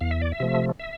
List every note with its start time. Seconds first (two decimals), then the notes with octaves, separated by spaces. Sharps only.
0.01 E2 F5
0.11 E5
0.22 D5
0.32 E5
0.40 C3 F3 A3
0.80 E5